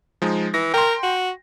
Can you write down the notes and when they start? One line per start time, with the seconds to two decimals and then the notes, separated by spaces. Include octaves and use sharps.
0.22 F3 G#3 D#4
0.54 E3 A#6
0.74 A#4 G5 C6
1.03 F#4